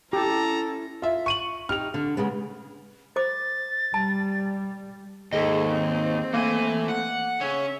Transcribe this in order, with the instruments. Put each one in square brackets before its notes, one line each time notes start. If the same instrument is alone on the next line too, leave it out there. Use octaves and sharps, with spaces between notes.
[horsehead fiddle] C#4 E4 [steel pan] G4 [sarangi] A4 [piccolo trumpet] A#5
[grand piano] F4 E5
C#6 D#7 F#7
[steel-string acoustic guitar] D#4 G4 [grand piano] F6 F7
[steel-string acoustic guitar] D3
C#3 G#3 B3
[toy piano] C5 D6 [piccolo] A6
[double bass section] G3 [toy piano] A5
[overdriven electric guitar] D#2 [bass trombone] G#2 [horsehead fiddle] G#4 A4 [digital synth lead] D#5
[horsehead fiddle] C4
[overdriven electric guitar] E3 G#5 [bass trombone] A3 [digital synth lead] A#3
[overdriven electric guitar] F#5
[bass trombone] C#3 [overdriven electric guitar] C#4 [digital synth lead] C#5 [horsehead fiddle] E5